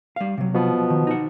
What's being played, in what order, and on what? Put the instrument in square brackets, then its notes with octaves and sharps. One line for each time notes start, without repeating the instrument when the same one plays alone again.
[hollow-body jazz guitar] G3 F5
C3 F#3
[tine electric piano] B2 F3 B3
[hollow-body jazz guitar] D#3
D#4 F#5